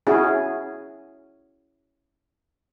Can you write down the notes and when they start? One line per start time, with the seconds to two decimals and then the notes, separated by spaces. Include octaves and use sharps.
0.07 C#4 E4 F#4 G#4